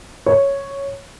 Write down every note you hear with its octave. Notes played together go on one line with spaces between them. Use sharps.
C#5